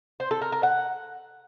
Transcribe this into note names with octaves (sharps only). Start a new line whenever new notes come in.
C5
A4
A#4
A#4
F#5